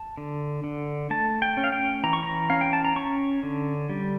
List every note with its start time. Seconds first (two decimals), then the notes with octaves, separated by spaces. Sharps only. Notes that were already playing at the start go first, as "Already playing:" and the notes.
Already playing: A5
0.17 D3
0.64 D3
1.10 A3 A5
1.42 G5
1.57 C#4
1.64 F5
1.72 G5
2.04 E3 A#5
2.13 C#6
2.23 A#5
2.50 C#4 F5
2.61 G5
2.73 A5
2.85 A#5
2.96 C#4 C#6
3.43 D3
3.90 G3